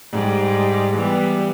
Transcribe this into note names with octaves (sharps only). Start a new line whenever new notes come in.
G#2 G3
E3 G3 B3